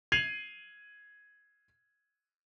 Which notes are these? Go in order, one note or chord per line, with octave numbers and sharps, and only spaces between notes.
G#6 C7 D#7 F7 F#7